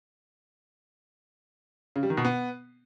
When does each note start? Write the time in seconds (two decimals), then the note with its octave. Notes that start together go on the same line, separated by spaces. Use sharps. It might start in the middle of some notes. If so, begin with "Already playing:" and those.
1.96 C#3
2.03 G3
2.10 D#3
2.17 B2
2.25 B3